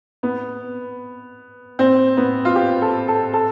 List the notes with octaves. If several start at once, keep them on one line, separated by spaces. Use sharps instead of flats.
B3
C4
B3
F4
G4
A4
A4
A4